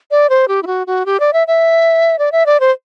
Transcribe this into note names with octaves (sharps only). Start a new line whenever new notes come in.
D5
C5
G4
E4
F#4
F#4
G4
D5
E5
E5
D5
E5
D5
C5